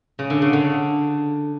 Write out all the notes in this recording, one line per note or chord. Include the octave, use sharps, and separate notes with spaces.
C#3
D3
C#3
D3